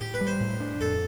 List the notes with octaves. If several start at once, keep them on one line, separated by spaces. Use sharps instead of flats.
A2 G4
B4
G3
C5
A2
D4
F2 A4